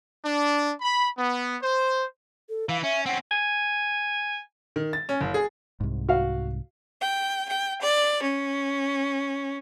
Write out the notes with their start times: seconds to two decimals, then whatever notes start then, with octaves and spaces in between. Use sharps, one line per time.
0.24 D4
0.81 B5
1.17 B3
1.62 C5
2.49 A4
2.69 E3 F5
2.83 C#4 E5
3.06 C4 C#4 F#5
3.31 G#5
4.76 D#3
4.93 A6
5.09 C#4
5.20 F#1
5.34 G#4
5.80 C2 G#2
6.09 F#4 F5
7.02 G5
7.48 G5
7.82 D5
8.22 C#4